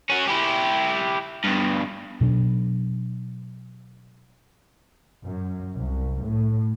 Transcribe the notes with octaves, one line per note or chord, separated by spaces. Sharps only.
C#4 F#4
E4 G4
G2 B2
B2 F#3 D4
F#2
C2
A2